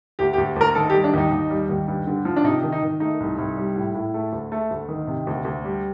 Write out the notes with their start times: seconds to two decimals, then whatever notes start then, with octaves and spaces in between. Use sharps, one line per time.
0.19 D2 G4
0.33 G4
0.38 D2
0.56 D2 A#4
0.75 D#3 A4
0.90 G4
0.94 G3
1.04 D4
1.14 D#2 D#4
1.31 D#2
1.50 G3
1.69 D#2
1.88 G2
2.07 D3
2.25 F3
2.36 D4
2.44 C3 D#4
2.63 D#3
2.72 D#4
2.82 D#3
3.00 A3 D#4
3.20 C2
3.38 C2
3.57 G3
3.76 A2
3.95 A2
4.14 A3
4.32 D2
4.52 A3
4.71 D2
4.89 D#3
5.07 C3
5.27 D2
5.45 D2
5.64 G3